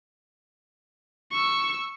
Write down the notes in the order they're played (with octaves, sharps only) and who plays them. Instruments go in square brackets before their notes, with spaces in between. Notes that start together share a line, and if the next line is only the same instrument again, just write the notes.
[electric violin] C#6 E6